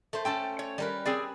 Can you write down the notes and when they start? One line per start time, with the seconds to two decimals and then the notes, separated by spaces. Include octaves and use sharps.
0.13 A3 C5
0.25 C#4 A4 C5 G5 A5
0.59 C#5
0.78 G3 A#4 B4
1.05 C4 G#4 D5 G#5